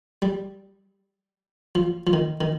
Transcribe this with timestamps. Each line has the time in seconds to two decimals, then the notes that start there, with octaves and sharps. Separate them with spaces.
0.22 G3
1.75 F3
2.07 F3
2.13 D#3
2.41 D#3